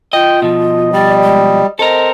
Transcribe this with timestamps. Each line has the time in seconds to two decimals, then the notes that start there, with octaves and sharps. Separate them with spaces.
0.13 F4 D#5 G5
0.42 B2 F3 D#5
0.93 G3 D5
1.24 G#3
1.79 C4 A4 A#4 D#5